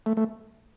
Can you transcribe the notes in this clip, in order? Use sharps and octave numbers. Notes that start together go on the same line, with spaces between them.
A3
A3